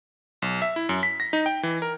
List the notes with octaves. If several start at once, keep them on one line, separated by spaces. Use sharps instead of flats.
B1
E5
E4
F#2
B6
A#6
D#4
G5
E3
A#4